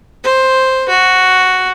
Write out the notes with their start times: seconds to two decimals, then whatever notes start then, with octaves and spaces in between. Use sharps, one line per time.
0.24 C5
0.89 F#4